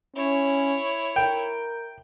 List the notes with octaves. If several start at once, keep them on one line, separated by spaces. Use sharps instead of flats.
C#4 E4 C#5
A#4 G5